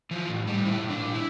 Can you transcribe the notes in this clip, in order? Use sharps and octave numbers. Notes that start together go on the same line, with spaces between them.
E3 F3
A2
A2 G3
A#2 E4
A#2
D4
A#2
E4